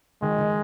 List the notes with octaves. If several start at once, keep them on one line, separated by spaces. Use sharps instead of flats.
D#3 G#3
D#3